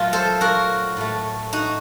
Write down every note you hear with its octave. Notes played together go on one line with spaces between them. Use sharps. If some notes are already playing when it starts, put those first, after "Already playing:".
Already playing: A#2 F#3 A3 F4
A4 C5
F#4 A#4
A2 A3
D#4 F#4